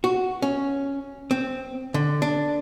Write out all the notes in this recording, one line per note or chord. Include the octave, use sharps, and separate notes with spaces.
F#4
C#4
C4
D3
D4